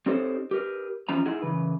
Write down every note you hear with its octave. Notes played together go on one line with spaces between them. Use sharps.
C4 D#4 G4 A4 C5 C#5
G4 A#4 B4
E2 F3 C#4 A#5
D#4 E4 G#4 F#5
C#3 E3 B4